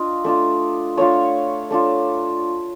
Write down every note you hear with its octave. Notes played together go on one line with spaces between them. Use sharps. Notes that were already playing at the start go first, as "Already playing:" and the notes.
Already playing: D4 F4 D#5
A3 D4 F4
A3 D4 F4 C#5
A3 D4 F4